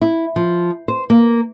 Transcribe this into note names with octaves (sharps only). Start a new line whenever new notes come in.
E4
F3
C5
A#3